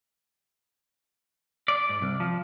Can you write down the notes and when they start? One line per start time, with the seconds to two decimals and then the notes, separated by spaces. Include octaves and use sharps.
1.68 D5
1.89 G#2
2.02 C2
2.20 F3